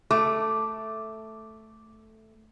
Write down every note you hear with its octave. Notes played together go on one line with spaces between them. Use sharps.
A3 D6